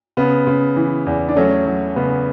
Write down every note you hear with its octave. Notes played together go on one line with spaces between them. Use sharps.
C#3 B3
C#3
E3
E2
D4
F#3 A3 C#4
F#3
C#3 B3